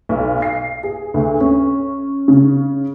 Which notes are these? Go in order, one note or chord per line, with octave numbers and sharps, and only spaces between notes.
B1
C7
G#4
D2
C#4
C#3